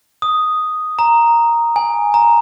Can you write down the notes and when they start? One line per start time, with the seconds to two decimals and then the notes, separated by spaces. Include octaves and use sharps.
0.22 D#6
0.99 A#5
1.76 G#5
2.14 A#5